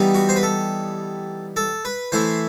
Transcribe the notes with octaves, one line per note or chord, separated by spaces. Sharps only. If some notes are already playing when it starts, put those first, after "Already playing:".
Already playing: E3 G3 B3 D#4
F#4
C5
B4
A4
A4
B4
E3 A3 E4 C5